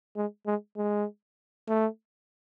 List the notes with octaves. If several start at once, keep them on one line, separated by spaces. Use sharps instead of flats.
G#3
G#3
G#3
A3